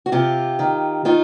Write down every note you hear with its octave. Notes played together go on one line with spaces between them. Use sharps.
F#4
C3 F4 G4
D#3
D#3 D#4 F4